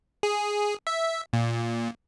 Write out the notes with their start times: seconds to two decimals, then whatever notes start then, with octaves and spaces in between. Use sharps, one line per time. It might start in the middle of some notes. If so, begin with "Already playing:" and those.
0.23 G#4
0.87 E5
1.33 A#2